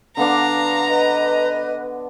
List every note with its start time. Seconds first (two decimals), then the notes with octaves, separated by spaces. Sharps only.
0.17 D3 B3 D4 F5 A#5
0.90 B4 D#5